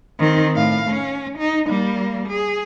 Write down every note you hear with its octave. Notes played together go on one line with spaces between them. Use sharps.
D#3 C4
A2 F5
C#4
D#4
G3 A#3
G#4